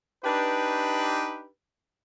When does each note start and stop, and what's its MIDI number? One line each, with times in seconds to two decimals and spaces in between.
0.24 1.47 62
0.24 1.47 63
0.24 1.47 67
0.24 1.47 71